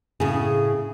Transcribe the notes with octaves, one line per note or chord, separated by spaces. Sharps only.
A2 C#3 G#4